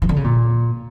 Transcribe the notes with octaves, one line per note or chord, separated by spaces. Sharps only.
E3
D3
C#3
A#2